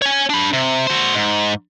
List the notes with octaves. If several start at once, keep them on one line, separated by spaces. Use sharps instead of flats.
C#5 G#5
D4 B5
C3
F#4 C5
G#2